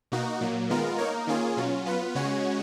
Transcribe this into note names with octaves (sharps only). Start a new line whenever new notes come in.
B2 A#3 D#4 F#4
A#2 F#3 A#3
D#3 G#3 B3 F4 A#4
A#3 D#4 A#4 C#5
D#3 A#3 C#4 F4 G#4
B2 F#3 C#4 F4
F#3 B3 F4 B4
C#3 G#3 C#4 F#4 C#5